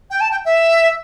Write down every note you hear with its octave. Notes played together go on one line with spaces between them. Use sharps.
G5
A5
G5
E5